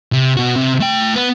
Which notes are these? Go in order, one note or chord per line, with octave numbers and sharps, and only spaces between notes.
C3
B2 F#4
C3
A3 G5
B3